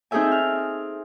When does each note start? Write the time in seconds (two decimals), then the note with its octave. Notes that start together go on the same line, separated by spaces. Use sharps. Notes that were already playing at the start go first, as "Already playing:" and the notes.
0.11 C4 D#4 G#4 A4 E5 G#5
0.32 F6